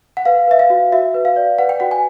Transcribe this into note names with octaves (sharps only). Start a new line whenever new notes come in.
F#5
B4 F5
B4 E5
F5
F#4
F#4 E5
B4
F5
D5
B4 F#5
G5
F#4 F#5
G#5